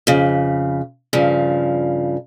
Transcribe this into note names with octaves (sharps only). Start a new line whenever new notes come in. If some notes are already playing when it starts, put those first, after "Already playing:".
F2 C#3
G2 C#3 F3